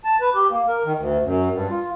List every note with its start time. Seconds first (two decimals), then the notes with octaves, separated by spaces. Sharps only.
0.04 A5
0.21 B4
0.35 G4
0.51 A#3
0.68 A#4
0.85 D#3
0.98 D2
1.23 F#2
1.53 G2
1.71 F4